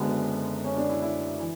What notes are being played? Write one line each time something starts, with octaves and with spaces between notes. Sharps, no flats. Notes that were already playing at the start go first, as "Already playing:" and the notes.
Already playing: F#1 F#2 D3 G#3 B3
C#4
D4
E4
E4
E3